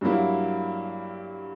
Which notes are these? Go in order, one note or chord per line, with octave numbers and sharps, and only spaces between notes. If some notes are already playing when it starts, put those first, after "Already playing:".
G2 F#3 A#3 E4